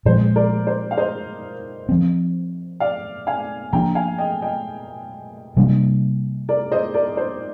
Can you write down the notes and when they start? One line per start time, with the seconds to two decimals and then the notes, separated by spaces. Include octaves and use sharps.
0.05 A#2 F3 G#3 C5
0.36 A#4 D5
0.67 C5
0.91 F5
0.98 C5 D#5
1.89 F3 C4
2.80 D5 F5
3.27 F5 G#5
3.73 F3 A#3 D4 G5 A#5
3.95 F5 G#5
4.18 D#5 G5
4.42 D#5 G5
5.57 C3 G3 A#3 D4
6.49 A#4 D5
6.72 C5 D#5
6.94 A#4 D5
7.17 C5